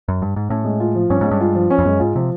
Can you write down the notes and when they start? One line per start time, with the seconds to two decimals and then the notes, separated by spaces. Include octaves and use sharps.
0.08 F#2
0.22 G2
0.36 G#2
0.49 A2 C#4
0.64 G#3
0.80 F4
0.95 F3
1.10 G2 C#4
1.21 G#2 G#3
1.31 G2
1.41 F4
1.55 F3
1.70 C#4
1.79 F2
1.85 F#2 G#3
2.00 G#2 F4
2.16 C3 F3